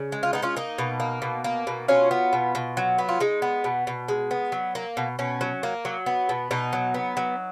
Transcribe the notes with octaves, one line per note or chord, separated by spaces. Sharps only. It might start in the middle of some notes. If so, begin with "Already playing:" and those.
Already playing: C#3
G#3
F4
B3 D#4
C#4 F4
A#3 D#4
B2
A#3
B2
A#3
B2
F#3 C#4 F4
B3
B2
B2
F#3
B3
F4
G#3 D#4
B3
B2
B2
G#3
B3
F#3
A#3
B2
B2 C#4
F#3
A#3
F#3
B3
B2
B2 D#4
F#3
B3
F#3